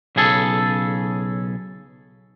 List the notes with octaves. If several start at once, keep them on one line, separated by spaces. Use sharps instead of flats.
B1 C#3 G#4 A4